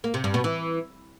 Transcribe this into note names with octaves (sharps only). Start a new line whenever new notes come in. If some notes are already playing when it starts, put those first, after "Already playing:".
A#3
C3
G2
B2
E3